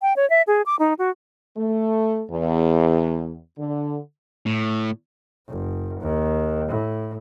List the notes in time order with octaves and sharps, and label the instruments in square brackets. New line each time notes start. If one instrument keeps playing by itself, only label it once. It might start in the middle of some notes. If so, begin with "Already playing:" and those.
[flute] G5
C#5
E5
G#4
D6
D#4
F#4
[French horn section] A3
E2
D3
[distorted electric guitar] A2
[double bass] F#1
D#2
A2